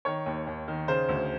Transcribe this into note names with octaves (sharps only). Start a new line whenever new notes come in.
D#3 C#5
D#2
D#2
D#3
C#3 C5
D2